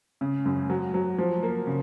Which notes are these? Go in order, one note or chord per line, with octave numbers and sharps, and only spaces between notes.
C#3
F#2
F#3
F#3
F3
A#3
C#3